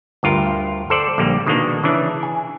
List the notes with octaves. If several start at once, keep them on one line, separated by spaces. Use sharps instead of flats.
D2 G2 F4 A#4
A4 C5 D5
A#1 D3 G3 A#3
B2 D#3 G#3 A#3 D4
C#3 E3 D4
G#5